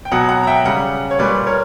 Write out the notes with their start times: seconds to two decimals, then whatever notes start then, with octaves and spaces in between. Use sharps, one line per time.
0.05 G5
0.11 B2 F#3 F#5 A#5
0.29 F#5 A#5
0.43 A#5
0.47 E5 G5
0.65 C#3 G3 F#5 A#5
1.11 C#5
1.19 A#2 G3 B4 D5
1.47 A#4 C#5